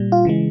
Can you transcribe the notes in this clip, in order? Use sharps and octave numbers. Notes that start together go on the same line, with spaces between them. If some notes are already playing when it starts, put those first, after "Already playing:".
Already playing: A#2 G3
F4
C#3 E3 G#3